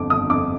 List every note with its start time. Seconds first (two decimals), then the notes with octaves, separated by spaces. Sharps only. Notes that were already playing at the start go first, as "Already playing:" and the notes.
Already playing: G1 F2 D6
0.10 G1 D#6
0.30 F2 D6